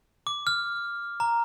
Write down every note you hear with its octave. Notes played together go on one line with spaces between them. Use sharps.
D6
F6
A#5